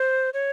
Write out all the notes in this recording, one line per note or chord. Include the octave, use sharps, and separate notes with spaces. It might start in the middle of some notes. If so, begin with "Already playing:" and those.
Already playing: C5
C#5